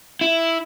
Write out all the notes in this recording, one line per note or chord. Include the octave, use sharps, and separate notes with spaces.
E4